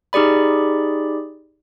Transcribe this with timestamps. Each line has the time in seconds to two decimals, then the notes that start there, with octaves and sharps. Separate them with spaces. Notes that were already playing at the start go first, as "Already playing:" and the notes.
0.13 D#4 G4 G#4 D5 B5